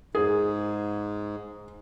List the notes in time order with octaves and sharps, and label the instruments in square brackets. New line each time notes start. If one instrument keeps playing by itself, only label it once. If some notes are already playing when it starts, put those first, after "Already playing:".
[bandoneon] G#2 [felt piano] G#4